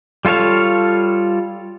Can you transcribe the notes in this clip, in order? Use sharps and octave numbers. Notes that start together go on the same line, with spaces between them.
G3 F4 A4 C#5 F5